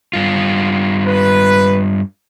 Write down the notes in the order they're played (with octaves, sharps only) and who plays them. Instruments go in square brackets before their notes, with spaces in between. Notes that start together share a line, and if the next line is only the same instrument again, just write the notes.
[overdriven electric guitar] G2 F4
[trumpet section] B4